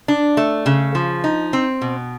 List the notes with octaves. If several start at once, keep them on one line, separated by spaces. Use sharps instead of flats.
D4
A3
C#3
F3
D#4
C4
B2